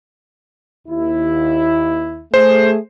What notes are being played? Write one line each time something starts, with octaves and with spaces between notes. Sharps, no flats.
D#2 E4
A3 G#4 C5